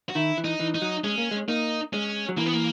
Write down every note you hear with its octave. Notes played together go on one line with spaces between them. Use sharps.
F#4
D#3 E4
E3
D#4
E3
D#4
F#3
G#3 C#4
A#3
G#3
A#3 D#4
G#3 C#4
F#3
E3 A#3
B3
A#3